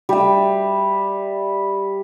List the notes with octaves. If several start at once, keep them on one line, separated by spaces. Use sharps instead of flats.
G3 E5